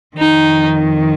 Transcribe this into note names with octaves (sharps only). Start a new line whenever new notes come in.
F2 D#3 D#4